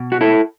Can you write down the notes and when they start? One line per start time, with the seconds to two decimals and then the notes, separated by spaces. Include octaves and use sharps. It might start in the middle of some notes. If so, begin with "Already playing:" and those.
Already playing: B2
0.12 F#4
0.21 E4 A4